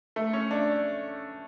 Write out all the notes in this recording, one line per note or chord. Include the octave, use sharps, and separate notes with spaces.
A3
C#4
D4